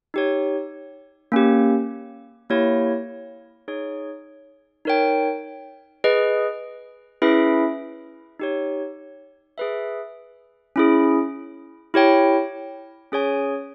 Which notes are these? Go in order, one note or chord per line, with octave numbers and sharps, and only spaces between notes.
D#4 G4 C#5
A#3 C#4 G4
A#3 E4 G4 C#5
D#4 G#4 C#5
D#4 A#4 C#5 G5
G#4 B4 D#5
C#4 E4 G#4 B4 E5
D#4 G4 C#5
G#4 B4 E5
C#4 E4 G#4
E4 G4 C#5 G5
C#4 G#4 C#5 G#5